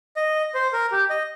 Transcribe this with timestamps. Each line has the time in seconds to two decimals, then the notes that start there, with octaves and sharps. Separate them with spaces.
0.16 D#5
0.54 C5
0.73 A#4
0.92 G4
1.10 D#5